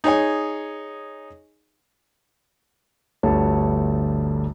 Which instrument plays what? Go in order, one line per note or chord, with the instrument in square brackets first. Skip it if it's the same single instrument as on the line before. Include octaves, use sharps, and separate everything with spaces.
[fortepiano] D#4 G#4 C#5 G#5
[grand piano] G1 D2 G3 A3 C#5 A5